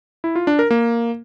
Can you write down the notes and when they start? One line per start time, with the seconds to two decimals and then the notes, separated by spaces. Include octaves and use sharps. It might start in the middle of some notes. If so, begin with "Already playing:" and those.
0.24 E4
0.36 F4
0.47 D4
0.59 A#4
0.71 A#3